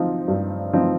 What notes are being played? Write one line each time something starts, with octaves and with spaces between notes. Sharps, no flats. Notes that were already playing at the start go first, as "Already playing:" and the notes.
Already playing: F3 C4 D#4
G2
F3 C4 D#4